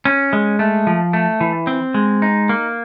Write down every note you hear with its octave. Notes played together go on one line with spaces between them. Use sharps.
C#4
G#3
A3
F3
A3
E3
C4
G#3
D#4
A#3